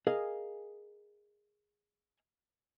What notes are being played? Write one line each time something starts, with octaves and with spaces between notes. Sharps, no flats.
G#4 A#4 D#5 F5 G#5